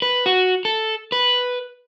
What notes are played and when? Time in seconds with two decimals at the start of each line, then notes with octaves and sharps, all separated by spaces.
0.02 B4
0.26 F#4
0.65 A4
1.12 B4